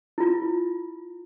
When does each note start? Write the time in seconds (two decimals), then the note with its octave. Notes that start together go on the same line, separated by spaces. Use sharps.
0.18 E4 F4